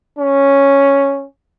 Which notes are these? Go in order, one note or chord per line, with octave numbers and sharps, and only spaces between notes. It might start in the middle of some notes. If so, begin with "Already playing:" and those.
C#4